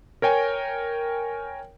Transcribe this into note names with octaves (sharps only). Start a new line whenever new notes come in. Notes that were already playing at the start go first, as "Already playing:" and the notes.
A#4 C#5 G5 G#5